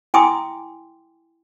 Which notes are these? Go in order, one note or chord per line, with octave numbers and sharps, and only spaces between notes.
E4 G5 G#5 C6 D6 D#6